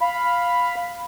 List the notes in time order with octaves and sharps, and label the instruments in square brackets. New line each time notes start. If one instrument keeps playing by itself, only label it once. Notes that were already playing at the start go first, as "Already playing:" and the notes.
[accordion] F5 B5